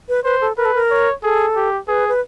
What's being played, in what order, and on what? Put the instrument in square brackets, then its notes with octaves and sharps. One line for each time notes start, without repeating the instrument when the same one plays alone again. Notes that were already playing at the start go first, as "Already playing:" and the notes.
[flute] B4
[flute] B4 [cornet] C5
[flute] A4
[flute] A#4 [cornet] B4
[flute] A4
A#4
[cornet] C#5
[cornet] G#4 [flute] A4
[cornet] G4
[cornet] G#4 [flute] B4
[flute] B4